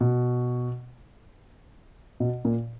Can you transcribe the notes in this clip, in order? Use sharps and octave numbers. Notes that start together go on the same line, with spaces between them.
B2
B2
A#2